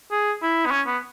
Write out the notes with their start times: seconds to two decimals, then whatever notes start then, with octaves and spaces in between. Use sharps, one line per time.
0.11 G#4
0.42 E4
0.66 B3
0.71 C#4
0.87 B3